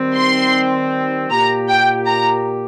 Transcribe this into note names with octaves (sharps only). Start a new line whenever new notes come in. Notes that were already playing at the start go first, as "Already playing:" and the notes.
Already playing: D#3 G3 C4
C6
A#2 A#3 G4 A#5
G5
A#5